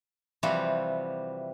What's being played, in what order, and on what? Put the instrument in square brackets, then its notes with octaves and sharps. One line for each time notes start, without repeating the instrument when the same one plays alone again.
[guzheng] C3 E3 F3 G3 C4 F#4